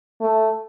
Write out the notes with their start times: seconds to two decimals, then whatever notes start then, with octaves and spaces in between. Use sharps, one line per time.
0.21 A3